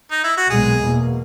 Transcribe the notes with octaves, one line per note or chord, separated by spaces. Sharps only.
D#4
E4
F#4
B1 A#2 G#3 B3 G#4
E2 B2 A#3